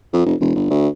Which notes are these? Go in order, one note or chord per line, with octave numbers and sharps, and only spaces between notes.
F2
F1
E1
G1
D2